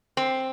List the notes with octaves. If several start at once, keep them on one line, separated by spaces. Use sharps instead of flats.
C4